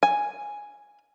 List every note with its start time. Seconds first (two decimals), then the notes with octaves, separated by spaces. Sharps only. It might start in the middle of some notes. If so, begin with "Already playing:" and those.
0.03 G#5